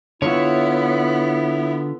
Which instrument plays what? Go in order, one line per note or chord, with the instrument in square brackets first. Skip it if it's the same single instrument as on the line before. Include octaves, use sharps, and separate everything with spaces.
[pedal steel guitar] D3 F4 E5 [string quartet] B3 [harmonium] E4 [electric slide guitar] C#5